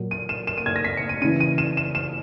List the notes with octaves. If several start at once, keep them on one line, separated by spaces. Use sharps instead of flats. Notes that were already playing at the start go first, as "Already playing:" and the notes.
Already playing: A#2 F#3
D#7
E7
E7
D#7
G#6
A#6
B6
C#7
D#7
C#3 E3 D#7
D#7
E7
E7
E7